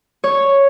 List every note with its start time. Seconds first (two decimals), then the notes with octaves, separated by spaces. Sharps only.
0.24 C#5